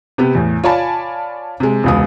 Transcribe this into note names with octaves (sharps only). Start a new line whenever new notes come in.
C3 B3 G4
E2 A2
F4 C#5 D5 G#5 A5 B5
C3 G#3
E1 C#2 D#6